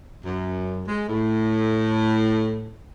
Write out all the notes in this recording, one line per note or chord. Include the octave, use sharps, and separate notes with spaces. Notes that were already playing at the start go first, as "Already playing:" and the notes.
F#2
G#3
A2